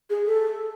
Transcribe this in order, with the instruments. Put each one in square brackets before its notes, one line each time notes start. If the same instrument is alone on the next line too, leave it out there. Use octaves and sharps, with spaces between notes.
[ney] G#4
A4